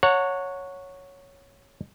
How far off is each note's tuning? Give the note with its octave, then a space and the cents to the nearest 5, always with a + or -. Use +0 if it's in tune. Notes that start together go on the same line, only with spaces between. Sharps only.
C#5 +0 F#5 -15 A#5 -45